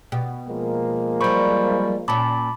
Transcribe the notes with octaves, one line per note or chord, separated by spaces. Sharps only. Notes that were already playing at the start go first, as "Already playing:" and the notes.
B2 G4
F3 G#3 A#3
F#3 G3 C5 B5 C#6
A#2 C#4 A5 B5 D6